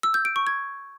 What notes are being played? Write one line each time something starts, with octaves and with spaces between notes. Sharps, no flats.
E6
G6
D7
C#6
G#6